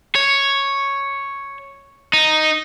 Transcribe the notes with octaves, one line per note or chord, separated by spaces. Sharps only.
C#5
D#4